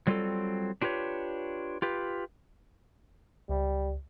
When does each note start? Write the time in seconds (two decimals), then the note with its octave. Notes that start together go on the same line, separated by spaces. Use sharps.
0.07 F#3 G3 C4 F4 G4 A4
0.82 D4 F4 G4 B4 C#5
1.82 F4 G4 B4
3.49 C#2 G3